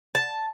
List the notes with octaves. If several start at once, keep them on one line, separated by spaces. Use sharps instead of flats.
A5